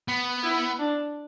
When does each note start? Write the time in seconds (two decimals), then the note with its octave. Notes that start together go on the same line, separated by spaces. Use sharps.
0.08 B3
0.43 E4
0.79 D4